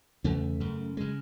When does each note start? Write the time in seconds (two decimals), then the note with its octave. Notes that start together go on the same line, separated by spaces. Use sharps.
0.24 E2 C#3 A3
0.60 F#2 C#3
0.97 C#3 G#3